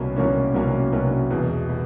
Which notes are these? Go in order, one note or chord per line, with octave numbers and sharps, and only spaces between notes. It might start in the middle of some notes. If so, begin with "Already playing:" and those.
Already playing: C2 B2 F#3 A#3 C#4
C2 B2 F#3 A#3 C#4
C2 B2 F#3 A#3 C#4
C2 B2 F#3 A#3 C#4
E1 E2 B2
B2